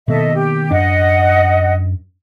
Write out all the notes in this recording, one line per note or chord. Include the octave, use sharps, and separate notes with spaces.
B2 D#3 A#3 A4 D#5 E5
G4
F#2 D4 D#5 F#5